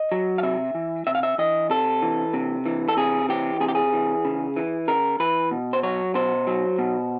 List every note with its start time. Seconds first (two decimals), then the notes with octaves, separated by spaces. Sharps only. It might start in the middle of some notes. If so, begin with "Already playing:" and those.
Already playing: D#5
0.12 F#3
0.38 F5
0.43 C3 E5
0.75 E3
1.07 C3 E5
1.15 F5
1.23 E5
1.38 E3 D#5
1.70 C3 A4
2.02 E3
2.33 C3
2.66 E3
2.88 A4
2.97 C3 G#4
3.29 E3 G4
3.60 C3 G#4
3.69 G4
3.75 G#4
3.93 E3
4.25 C#3
4.56 E3
4.88 C#3 A#4
5.20 E3 B4
5.51 B2
5.73 C5
5.83 F#3 C#5
6.15 B2 C5
6.47 F#3
6.78 B2